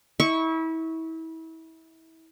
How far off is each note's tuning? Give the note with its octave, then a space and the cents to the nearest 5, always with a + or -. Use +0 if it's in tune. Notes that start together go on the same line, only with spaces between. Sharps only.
E4 -30 C#6 +0